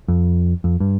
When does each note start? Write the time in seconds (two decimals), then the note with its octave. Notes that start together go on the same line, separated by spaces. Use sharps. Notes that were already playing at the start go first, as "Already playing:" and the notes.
0.08 F2
0.64 F2
0.80 G2